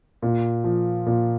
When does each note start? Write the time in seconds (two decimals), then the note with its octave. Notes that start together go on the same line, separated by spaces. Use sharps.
0.22 A#2
0.64 F3
1.06 A#2